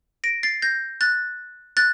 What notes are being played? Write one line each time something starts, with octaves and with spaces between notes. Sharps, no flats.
A#6 D7
A6 C7
G6 A#6
F#6 A6
F#6 A6